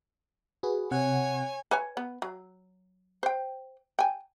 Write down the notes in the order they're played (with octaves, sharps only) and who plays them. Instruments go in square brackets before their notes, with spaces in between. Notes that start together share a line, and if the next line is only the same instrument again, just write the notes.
[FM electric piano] F#4 G#4 B4
[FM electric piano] C3 F#5 [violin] C#5 G#5
[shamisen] B4 C#5 G#5
B3
F#3
C5 G5
G5 G#5